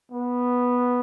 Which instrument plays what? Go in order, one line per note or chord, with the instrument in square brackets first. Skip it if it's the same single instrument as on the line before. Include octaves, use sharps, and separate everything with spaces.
[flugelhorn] B3